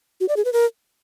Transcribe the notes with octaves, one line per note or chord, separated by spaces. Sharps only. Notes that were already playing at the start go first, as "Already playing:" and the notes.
F#4
D5
G#4
B4
A#4